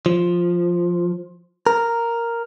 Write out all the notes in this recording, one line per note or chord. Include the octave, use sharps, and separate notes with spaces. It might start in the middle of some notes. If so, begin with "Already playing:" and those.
F3
A#4